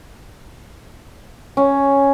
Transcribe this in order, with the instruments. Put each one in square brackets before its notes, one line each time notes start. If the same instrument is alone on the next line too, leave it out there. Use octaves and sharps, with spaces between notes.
[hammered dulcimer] C#4